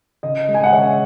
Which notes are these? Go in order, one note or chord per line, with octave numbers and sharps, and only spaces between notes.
C#3 D#5
G#3
G#5
F#5
C#3 C#5 E5